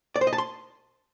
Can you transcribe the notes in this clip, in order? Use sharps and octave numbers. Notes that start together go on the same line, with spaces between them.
D5
C5
D#5
A5
C6